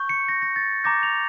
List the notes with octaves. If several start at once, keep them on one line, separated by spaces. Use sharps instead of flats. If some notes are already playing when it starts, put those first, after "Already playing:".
Already playing: C#6 G6
C#7
A#6
A#6
A6
A#5 D6 G6 A#6
F7